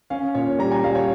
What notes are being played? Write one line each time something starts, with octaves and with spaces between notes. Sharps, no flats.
C#4 F5
A#2 C#5
G3 A#5
G#5
G3 F5
C#5